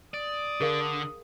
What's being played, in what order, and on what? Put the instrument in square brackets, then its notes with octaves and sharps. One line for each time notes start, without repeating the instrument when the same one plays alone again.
[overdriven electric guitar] D5 [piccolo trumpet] D#6
[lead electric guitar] D3 [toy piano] G#4 A#4 F5